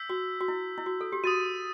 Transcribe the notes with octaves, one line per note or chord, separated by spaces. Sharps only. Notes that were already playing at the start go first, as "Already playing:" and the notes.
Already playing: E6 G6 B6
F#4
F#4
E4
E4
F#4
A4
G4
F#4 D#6 A6 D#7